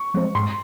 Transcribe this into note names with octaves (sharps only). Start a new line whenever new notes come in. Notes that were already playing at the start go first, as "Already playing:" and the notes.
Already playing: C#6
F3 G#3 C4
G#2 C6